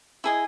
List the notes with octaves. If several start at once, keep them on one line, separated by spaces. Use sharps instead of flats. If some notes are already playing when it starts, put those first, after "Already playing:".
E4 G#4 D#5